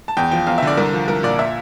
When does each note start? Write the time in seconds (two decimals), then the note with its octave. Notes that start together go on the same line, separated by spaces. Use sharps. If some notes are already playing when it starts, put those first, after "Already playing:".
0.08 A5
0.17 E2 G5
0.31 F3 G5
0.47 E2 F5
0.58 E5
0.62 D3 D5
0.77 C2 A#4
0.93 F3
1.08 C2 A#4
1.23 A#2 D5
1.39 E5